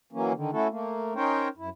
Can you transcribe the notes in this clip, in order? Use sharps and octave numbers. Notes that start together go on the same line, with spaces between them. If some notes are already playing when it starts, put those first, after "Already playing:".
E3 F#3 A#3 C#4
D3 D#3
A3 C#4 E4 F#4 A4
A3 A#3
C#4 D#4 A#4 C5 C#5 G5
F#2 E4